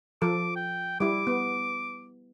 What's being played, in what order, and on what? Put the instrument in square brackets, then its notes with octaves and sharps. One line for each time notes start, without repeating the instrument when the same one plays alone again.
[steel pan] F3 A4 [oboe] D6
[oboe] G5
[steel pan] G3 E4 [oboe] D6
[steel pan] B3